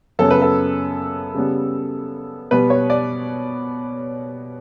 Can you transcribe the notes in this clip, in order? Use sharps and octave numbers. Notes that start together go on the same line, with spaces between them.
F#2 C#3 F#3 B3 A4
B4
A4
C#3 G3 B3
B2 G3 B3 B4
C#5
D5